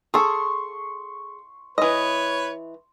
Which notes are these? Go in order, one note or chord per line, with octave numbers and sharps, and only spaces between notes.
G#4 A4 C6 C#6
E3 B4 C#5 D#5